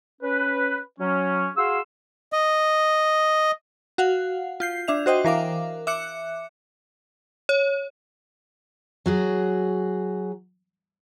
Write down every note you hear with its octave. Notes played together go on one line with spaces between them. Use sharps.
C#4 B4
F#3 C#4
F#4 G#4 F5 C6 E6
D#5
F#4 F5 F#5
F4 G6 C7
D4 E5 F7
F#4 C5 D#5 G5
E3 A#4 F5 D6
E5 D6 F#6 C#7
C#5
F#3 F#4 G#4